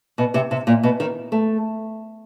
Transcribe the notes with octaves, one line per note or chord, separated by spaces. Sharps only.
B2
C3
C3
A#2
B2
D#3
A3